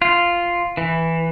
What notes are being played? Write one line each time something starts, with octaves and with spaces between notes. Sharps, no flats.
F4
E3